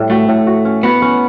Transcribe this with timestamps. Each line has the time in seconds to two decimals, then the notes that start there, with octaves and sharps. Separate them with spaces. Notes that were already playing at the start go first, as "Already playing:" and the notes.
Already playing: A2 G3
0.10 A3 F#4
0.29 A2
0.47 F#4
0.65 C#4
0.83 B3 F#4
1.02 C#4